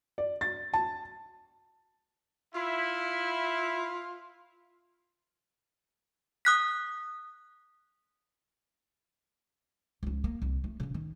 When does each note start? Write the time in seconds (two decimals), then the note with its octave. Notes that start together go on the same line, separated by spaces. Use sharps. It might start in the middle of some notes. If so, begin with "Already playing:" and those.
0.18 D5
0.41 A6
0.73 A5
2.55 E4 F4
6.45 D#6 F#6 B6
10.03 C#2 F3
10.24 A#3
10.42 C2
10.64 A3
10.80 C#3 C#4
10.94 D#3